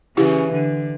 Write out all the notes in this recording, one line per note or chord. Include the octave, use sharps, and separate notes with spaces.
C#3 E3 E4 G4
D3